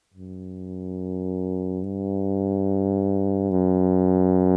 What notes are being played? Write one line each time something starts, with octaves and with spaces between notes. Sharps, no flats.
F#2
G2
F#2